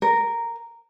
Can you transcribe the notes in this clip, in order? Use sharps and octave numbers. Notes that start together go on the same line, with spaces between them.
A#4